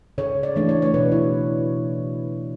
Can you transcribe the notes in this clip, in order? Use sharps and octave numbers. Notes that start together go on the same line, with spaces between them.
C#3 C#5
D5
E3 A3 D4
C#5
C#5
B2 B4
E4